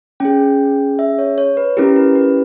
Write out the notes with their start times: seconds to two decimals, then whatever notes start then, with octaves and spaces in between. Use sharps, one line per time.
0.20 C#4 G#4 G5
0.99 E5
1.18 C#5
1.38 C#5
1.57 B4
1.77 C#4 E4 G4 A#4
1.96 B4
2.16 B4